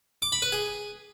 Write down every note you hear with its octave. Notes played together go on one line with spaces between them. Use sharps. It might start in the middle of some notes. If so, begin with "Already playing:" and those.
D6
B5
B4
G#4